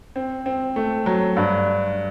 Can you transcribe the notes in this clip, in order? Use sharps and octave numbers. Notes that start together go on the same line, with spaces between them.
C4
C4
A3
F#3
G2